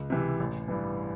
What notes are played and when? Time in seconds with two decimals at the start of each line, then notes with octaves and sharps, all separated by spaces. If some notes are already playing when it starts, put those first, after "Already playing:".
Already playing: C#2
0.10 C3 E3
0.39 A1
0.68 G2 E3